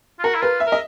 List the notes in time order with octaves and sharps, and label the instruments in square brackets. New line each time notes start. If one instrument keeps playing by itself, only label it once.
[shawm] F4
[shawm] F#4 [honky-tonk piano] A#4
[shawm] E4
[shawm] F4 [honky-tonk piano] B4
[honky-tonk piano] E5
[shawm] A#4
[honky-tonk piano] D#5